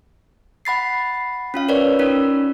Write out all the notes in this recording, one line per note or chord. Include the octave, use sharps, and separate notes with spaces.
F#5 B5 A6 C7
C#4 F4 F5
A#4 B4 C#5 D5
C#4 D#4 F4 A#4